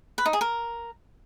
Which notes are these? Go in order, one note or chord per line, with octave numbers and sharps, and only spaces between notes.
B4
D#4
G#4
A#4